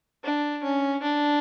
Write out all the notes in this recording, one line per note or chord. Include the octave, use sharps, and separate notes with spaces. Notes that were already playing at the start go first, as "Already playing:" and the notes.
D4
C#4
D4